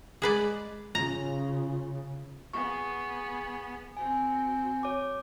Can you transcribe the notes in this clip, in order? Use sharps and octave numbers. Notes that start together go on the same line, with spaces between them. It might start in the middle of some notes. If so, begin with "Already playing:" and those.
G#3 G#4 B4 D5
C#3 F4 A#5
B3 G#4 C#6
C4 F#4 G#5
C#5 D6